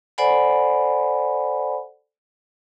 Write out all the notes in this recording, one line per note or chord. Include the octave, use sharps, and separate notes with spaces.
A4 C5 D5 F#5 G#5 B5